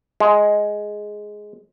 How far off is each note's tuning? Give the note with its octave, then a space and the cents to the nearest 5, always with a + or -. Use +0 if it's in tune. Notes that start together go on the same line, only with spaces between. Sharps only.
G#3 +5